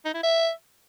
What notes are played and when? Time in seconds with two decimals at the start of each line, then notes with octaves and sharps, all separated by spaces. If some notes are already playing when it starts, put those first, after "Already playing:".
0.05 D#4
0.14 E4
0.23 E5